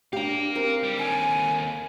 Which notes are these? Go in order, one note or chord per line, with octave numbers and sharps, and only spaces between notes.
D4 G4 F5 A#5
C4 D#4 A#4
G3
D#2 A4 G#5